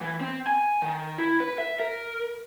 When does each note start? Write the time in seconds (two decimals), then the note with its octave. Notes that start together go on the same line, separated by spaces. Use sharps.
0.01 E3
0.21 C4
0.47 G#5
0.82 D#3
1.18 E4
1.40 B4
1.58 E5
1.80 A#4